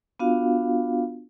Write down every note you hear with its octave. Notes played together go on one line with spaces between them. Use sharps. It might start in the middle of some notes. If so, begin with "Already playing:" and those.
B3 D4 F4 F#4 F5